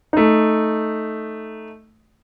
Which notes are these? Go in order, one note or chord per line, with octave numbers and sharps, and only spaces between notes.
A3 D#4